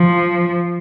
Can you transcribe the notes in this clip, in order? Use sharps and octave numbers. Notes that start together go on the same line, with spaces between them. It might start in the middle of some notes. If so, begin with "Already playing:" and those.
Already playing: F3